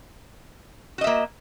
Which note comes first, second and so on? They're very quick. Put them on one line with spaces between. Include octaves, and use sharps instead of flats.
F#4 D#5 E5 A#3